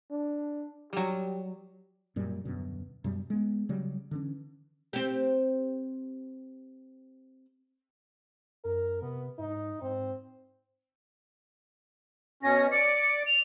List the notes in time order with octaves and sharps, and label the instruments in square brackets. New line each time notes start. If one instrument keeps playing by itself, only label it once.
[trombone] D4
[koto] F#3 G3 [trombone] G4
[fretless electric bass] F#2 A#2 G3
D#1 F#2 B2 D3
F#2 B2 G3
G#3 B3
C#3 F#3 G3
D3 E3 C#4
[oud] C4 G4
[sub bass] F#2 [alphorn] A#4
[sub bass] C3 [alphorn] B3
[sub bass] G#2 [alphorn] D#4
[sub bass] G#2 [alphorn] C4
[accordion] B2 C#4 [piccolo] A#6
[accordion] D5 [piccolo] C#7
[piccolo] F7